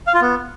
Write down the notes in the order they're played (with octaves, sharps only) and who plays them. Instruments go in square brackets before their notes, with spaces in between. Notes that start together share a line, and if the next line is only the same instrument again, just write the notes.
[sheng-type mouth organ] F5
F4
B3